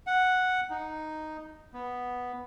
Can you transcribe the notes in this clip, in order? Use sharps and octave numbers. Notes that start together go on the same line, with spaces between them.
F#5
D#4
B3